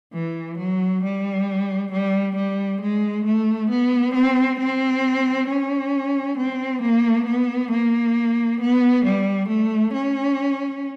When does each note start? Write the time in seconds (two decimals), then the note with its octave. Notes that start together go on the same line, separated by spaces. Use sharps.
0.13 E3
0.58 F#3
1.03 G3
1.92 G3
2.36 G3
2.81 G#3
3.25 A3
3.70 B3
4.14 C4
4.59 C4
5.48 C#4
6.38 C4
6.82 A#3
7.26 B3
7.71 A#3
8.61 B3
9.05 G3
9.48 A3
9.94 C#4